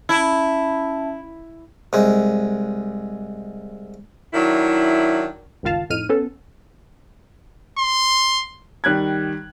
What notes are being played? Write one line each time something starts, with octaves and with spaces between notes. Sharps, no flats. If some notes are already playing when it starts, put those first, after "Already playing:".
C#4 E4 E5 A5
C2 G#3
D#3 F#3 D4 E4
G1 C#2 D#3 F4 F5 A5
F2 A2 D#4 F6 D#7
B3 C#4 A4
C6
D#3 G3 F#6 G#6